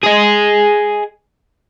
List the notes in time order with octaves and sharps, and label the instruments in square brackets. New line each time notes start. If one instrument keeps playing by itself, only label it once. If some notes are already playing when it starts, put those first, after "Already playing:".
[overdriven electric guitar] G#4 D#5